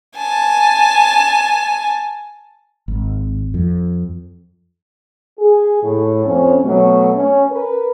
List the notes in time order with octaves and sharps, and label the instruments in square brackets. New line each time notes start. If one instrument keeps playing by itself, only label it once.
[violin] G#5 A5
[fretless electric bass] G#1
F2
[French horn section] G#4
A2
F2 F3 C#4
B2 F#3 A3
C#4
A#4 B4